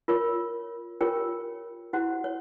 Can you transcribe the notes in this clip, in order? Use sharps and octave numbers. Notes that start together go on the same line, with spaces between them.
F4 A#4 C#5
F4 G4 A#4 C#5 G5
E4 F#4 G4 C5 F#5
C#5